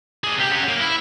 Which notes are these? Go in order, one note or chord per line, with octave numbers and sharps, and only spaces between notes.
D4 G#4
C2 G4
C#4 F#5
A#3
E4